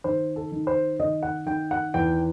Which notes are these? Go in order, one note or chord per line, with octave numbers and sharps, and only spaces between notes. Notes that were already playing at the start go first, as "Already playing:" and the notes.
D#3 C5
A4
D#3
C5
D#3 D#5
F#5
D#3 G5
F#5
E2 G5